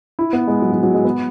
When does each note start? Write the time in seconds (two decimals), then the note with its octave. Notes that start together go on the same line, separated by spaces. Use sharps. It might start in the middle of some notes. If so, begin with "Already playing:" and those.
0.19 E4
0.33 B3
0.48 G#3
0.62 F#3
0.73 F#3
0.83 F#3
0.94 G#3
1.04 B3